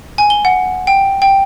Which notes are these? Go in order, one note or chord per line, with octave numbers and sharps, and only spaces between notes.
G#5
G7
F#5
G5
G5